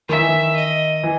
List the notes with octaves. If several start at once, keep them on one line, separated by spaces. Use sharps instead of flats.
D#3 E5
E3
D#3
D#5
E3